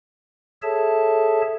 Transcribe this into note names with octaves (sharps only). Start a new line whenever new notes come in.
G#4 A4 C#5 E5 A5